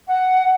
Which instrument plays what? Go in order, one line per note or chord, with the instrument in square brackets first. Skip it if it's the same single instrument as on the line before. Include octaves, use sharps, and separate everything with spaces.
[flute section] F#5